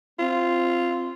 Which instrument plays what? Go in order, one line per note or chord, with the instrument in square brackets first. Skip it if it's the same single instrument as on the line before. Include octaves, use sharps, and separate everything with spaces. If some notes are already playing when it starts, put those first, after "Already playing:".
[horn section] C4 [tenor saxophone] F4